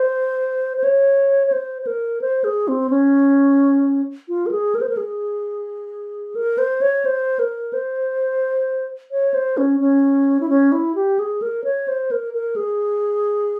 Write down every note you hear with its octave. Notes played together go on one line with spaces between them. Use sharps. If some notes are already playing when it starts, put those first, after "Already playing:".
Already playing: C5
C5
C#5
C#5
C5
C5
A#4
C5
G#4
C4
C#4
F4
A#4
G#4
A#4
C5
A#4
G#4
A#4
C5
C#5
C5
A#4
C5
C#5
C5
C#4
C#4
E4
C#4
E4
G4
G#4
A#4
C#5
C5
A#4
A#4
G#4